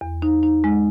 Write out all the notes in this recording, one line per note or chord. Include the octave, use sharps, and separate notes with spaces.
E2
D#4
D#4
G#3